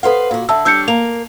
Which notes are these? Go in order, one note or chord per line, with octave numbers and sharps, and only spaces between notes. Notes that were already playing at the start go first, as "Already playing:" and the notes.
A4 B4 C5 F5 F#5
A#2 F#4
D3 E5 A5 E6
G3 D4 C#5 E6 G6 C#7
A#3 F7